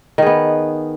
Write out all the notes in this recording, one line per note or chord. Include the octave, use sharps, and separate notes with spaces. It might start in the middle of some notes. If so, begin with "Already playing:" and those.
D#3 B3 G#4